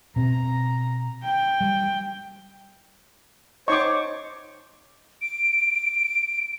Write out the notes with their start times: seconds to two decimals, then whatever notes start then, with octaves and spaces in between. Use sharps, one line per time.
0.16 B2 C4 A#5
1.23 G5
1.61 G3
3.68 D#4 C5 C#5 D#5 C#6 D6
5.21 D7